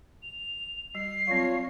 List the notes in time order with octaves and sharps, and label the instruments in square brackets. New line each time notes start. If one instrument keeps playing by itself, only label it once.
[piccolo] F7
[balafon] G3 [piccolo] C7
[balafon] F#3 C4 [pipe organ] F4 C#5